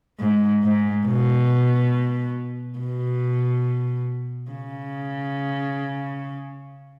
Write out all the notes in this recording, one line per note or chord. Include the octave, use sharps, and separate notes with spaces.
G#2
G#2
B2
B2
C#3